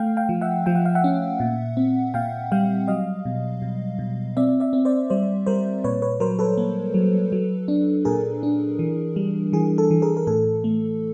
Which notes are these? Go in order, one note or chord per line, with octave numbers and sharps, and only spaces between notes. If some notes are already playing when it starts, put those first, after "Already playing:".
Already playing: A3 F5 G5
F5 G5
F3
E5 F#5
F3 G5
F#5
F5
E5 F#5
C#4
A#2
C4
A#2 F5 G5
G3 F5 G5
F#3 D#5 F5
B2
B2
B2
C4 D5 E5
D5 E5
C4
C5 D5
G3 C5 D5
G3 A#4 C5
A#2 B4 C#5
B4 C#5
F#3 A#4 C5
A4 B4
A#3
F#3
F#3
D4
A#2 G#4 A#4
D4
E3
G3
E3 G#4
A4
E3
G#4 A#4
A#4
A2 A4
A3